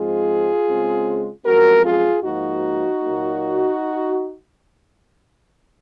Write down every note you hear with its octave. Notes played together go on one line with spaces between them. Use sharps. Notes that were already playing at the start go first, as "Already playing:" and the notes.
Already playing: G#2 F3 G#3 C4 F4 G#4
C#3 G#3 C4
F#2 F3 G#3 C4 F#4 A#4
F4 G#4
G#2 F3 A#3 D#4 F#4
A#2 F#3 A#3